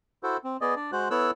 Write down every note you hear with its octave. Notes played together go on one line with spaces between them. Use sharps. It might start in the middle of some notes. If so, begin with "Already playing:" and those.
E4 F#4 A4 C5
C4
B3 G#4 D5 D#5
D4 D5
G#3 F#4 C5 F#6
B3 E4 A4 C#5 E6 F#6